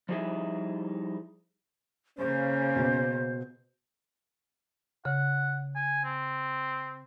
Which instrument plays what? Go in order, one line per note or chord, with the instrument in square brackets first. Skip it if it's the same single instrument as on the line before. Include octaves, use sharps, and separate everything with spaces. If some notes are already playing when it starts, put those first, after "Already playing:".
[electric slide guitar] F3 G3 D#4 E4 G#4 E5
[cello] C#3 A#3 [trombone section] C#4 [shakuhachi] C5
[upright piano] B2
[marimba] C#3 [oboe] F#5
[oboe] G#5
C4